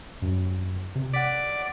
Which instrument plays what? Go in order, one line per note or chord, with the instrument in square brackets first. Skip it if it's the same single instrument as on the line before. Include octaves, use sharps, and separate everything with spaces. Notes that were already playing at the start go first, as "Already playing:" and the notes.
[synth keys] F#2
C3
[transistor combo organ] D5 [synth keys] F#5 B6